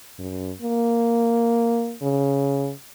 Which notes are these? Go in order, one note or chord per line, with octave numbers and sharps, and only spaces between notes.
F#2
A#3
C#3